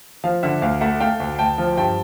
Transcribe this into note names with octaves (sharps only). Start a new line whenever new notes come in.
F3 F5
D3 E5 F#5
D2 F5
A3 E5 F#5
A3 F5 G5
D2
D2 G5 A5
F3
G2 G5 A5